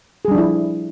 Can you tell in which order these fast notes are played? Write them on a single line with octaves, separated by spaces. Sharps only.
G#4 G3 D4 F3 E4